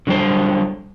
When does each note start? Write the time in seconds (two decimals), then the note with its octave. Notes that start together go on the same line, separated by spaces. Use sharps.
0.07 D3 F#3 G3 C5